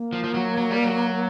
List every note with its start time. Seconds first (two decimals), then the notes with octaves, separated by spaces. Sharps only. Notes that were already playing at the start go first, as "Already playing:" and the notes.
Already playing: A#3
0.13 F3
0.24 F3
0.34 F#3
0.57 F#3
0.71 G3
0.84 F#3